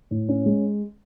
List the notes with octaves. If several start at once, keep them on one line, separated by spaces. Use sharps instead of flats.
A2
C#4
G#3